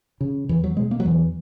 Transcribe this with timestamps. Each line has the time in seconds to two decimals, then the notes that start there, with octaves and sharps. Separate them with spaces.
0.21 C#3
0.49 E2 E3
0.64 F#3
0.77 B2 G#3
0.91 A#3
1.00 F#3
1.05 E2 E3